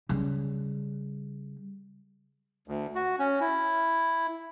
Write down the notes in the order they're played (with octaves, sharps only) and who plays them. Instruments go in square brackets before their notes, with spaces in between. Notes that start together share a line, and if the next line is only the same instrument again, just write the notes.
[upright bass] C#3 G3
[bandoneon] D2
F#4
C#4
E4